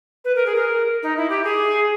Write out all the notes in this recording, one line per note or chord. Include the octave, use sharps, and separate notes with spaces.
B4
A#4
G#4
A#4
D#4
E4
G4
G#4